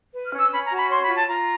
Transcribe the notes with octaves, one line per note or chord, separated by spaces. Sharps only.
B4
F6
C#4
E6
C#4 B5
A#5
F#4
B5
C#5 C6
B5
F4
A5
F4 A#5